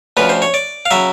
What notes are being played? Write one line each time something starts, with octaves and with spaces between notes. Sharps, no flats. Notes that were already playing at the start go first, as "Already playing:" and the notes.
D2 C#3 F3 B4
C5
C#5
D5
F5
C#3 F#3 E5